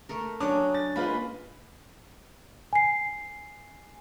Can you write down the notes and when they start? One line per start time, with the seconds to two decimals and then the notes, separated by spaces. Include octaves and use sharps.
0.09 A3 A4 A#4
0.40 F#3 C#4 D4 C#5 D6 D#6
0.74 A6
0.96 G#3 A#3 F4 B4 B5
2.73 G#5 C7